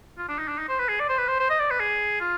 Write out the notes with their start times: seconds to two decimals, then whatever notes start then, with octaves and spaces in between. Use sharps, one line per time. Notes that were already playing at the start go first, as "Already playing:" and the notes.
0.18 F4
0.28 D4
0.39 D#4
0.48 D4
0.59 D#4
0.69 C5
0.79 B4
0.89 G#4
1.00 D5
1.09 C5
1.18 B4
1.28 C5
1.39 C5
1.50 D#5
1.60 D5
1.70 B4
1.80 G#4
2.20 F4